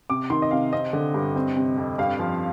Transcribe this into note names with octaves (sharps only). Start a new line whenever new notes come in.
C3 D6
D#3 C6
D#5
C3 F5
C4 D#5
D3
G2
C4
C3
F2
G2 F5
F3